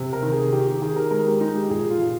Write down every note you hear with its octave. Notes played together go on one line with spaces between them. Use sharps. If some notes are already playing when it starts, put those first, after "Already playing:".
Already playing: C3
A#4
D#3
G#4
D#3 G4
G4
D#3 G#4
A#4
G#3 A#4
G4
G#3 D#4
G4
A#2 G#4
F4
A#2